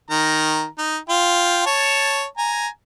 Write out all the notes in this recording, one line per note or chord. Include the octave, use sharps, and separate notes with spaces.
D#3 A#5
D#4
F4 G5
C#5 A5
G#5 A#5